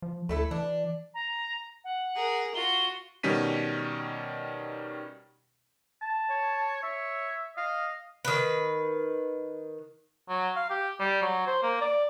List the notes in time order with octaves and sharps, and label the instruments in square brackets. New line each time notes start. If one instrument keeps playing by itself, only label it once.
[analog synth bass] F3
[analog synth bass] D2 [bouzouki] A3 E4 A4
[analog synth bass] E3 [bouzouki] D4
[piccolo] A#5
F#5
[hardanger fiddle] G#4 A#4
[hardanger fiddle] F4 F#4 [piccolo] G7
[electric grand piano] B2 D#3 G3 C#4 B6 D#7
[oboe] A5
[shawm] C#5
[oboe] C#5 [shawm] E5
[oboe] D#5 [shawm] F5
[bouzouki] D#3 B4
[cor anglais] F#3
F5
G4
G3
F#3
C5
A#3
D5